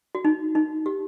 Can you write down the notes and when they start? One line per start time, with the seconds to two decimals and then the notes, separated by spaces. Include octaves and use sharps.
0.15 F#4
0.25 D#4
0.55 D#4
0.86 G4